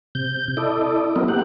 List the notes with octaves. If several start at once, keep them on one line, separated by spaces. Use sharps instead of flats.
C3 G6
E4 A4 D5 D#5
F#3 B3 C4 A#4 D#5
A#3 G4 F#5